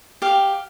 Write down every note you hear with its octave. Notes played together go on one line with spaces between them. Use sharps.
G4 F5